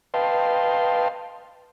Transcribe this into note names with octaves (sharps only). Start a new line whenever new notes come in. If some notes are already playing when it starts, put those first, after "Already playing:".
B4 D#5 F5 G5 A5 C6